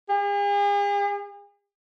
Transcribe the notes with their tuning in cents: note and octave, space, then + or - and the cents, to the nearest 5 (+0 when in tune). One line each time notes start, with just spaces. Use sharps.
G#4 -45